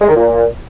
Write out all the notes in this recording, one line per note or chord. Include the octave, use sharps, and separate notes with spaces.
G#3
D#3
A#2